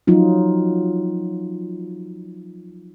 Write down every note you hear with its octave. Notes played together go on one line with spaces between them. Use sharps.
F3 F#3 D#4 F4